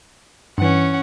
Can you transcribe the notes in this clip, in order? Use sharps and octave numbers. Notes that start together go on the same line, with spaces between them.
G2 E3 C#4 F#5